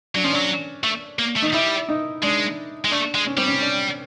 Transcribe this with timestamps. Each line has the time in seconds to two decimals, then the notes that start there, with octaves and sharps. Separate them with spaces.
0.15 F#3 D4
0.24 F3 C#4
0.32 F#3 D4
0.84 A3
1.19 A#3
1.36 A3
1.42 D#4
1.53 G3 E4
1.89 D#4
2.22 G#3 D4
2.85 G#3
2.91 A3 D4
3.15 G#3
3.27 C#4
3.37 G3 C4
3.47 C#4
3.61 D4